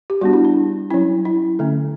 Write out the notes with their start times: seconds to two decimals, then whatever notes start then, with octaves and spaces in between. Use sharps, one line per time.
0.10 G4
0.21 G3 B3 D4 F#4
0.33 E4
0.45 D4
0.90 F#3 C#4 E4
1.25 E4
1.59 D3 A3 C#4